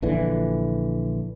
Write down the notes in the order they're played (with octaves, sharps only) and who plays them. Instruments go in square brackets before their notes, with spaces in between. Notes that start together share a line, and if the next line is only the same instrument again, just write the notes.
[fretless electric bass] A#1 D3 E3